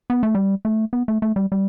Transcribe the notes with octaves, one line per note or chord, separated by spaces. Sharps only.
B3
A3
G3
A3
B3
A3
A3
G3
G3